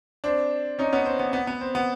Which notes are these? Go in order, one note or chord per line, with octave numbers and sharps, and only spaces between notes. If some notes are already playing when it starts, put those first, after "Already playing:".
C4 D4
C#4 D#4
B3 C#4
C4
B3
B3
B3
C4
B3